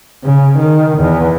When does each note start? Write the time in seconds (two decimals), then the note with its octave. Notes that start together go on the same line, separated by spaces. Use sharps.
0.24 C#3
0.58 D#3
0.99 E2